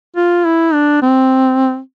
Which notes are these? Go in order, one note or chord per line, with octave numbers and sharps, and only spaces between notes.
F4
E4
D4
C4